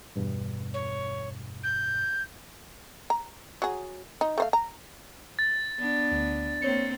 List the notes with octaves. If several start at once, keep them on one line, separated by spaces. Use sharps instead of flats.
E2 G2 B2
C#5
G6
A#5
F#3 G#4
D#4
A3 C5 F5
A#5
A6
B3 D4
D2
A#3 C4 C#5 C#7